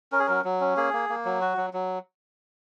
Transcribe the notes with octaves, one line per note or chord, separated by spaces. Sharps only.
C#4 A#4
G#4
F#3 A#4
F#3
C#4
A#3 G#4
A#3
A#3
F#3
F#4
F#3
F#3